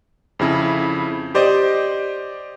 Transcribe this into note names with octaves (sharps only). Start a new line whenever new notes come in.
F2 C#3 E4
G4 C5 D5 D#5